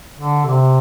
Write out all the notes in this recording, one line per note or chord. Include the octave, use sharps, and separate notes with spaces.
D3
C3